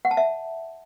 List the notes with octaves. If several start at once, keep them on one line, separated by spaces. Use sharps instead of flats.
F#5
A5
E5